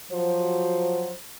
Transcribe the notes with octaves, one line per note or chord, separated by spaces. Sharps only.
F3 F#3 F#4 C5